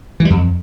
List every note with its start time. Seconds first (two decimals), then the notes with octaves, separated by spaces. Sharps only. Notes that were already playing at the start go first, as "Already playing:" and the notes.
0.20 E3
0.25 G3
0.30 F2